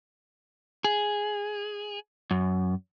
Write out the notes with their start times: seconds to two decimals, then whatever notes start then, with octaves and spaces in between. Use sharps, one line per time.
0.84 G#4
2.31 F#2